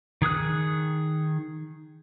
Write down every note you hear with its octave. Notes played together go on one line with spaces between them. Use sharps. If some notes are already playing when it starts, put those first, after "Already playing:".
D#3 G#4 D#6 F#6